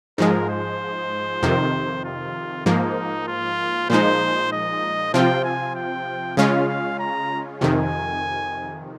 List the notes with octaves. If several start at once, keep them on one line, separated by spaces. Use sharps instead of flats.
G#2 F3 G#3 A#4
C5
F2 C3 D#3
F4
G#2 F3 A#3 D#4
F4
A#2 F3 G#3 D#4 C5
D#5
C3 F3 C4 F4 G5
G#5
G5
C#3 G#3 C#4 F4 F5
F5
A#5
F2 C3 D#3 G#5